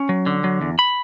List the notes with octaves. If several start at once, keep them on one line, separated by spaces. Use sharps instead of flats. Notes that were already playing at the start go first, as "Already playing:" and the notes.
Already playing: C#4
F#3
D3
F#3
E2
B5